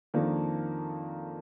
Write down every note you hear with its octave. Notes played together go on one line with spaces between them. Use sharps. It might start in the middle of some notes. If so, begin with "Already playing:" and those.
F2 D#3 A#3 D4 A4